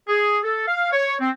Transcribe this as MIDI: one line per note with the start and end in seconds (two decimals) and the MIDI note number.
0.08 0.38 68
0.44 0.63 69
0.67 0.89 77
0.92 1.15 73
1.20 1.30 60